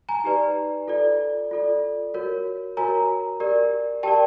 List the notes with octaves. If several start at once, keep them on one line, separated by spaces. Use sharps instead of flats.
G#5 A#5
D#4 G4 B4 D5
F4 A4 D5
F4 A4 D5
F#4 A#4 C#5
F#4 A#4 C#5 G#5 A#5
G4 A#4 D5
G4 A#4 D5 G5 A5